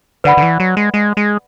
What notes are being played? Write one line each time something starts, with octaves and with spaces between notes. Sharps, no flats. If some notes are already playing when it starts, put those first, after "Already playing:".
D3 B4 D5 F#5 B5
D3
E3
F#3
G#3
G#3
G#3